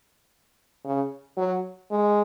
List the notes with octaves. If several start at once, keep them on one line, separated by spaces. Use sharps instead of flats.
C#3
F#3
G#3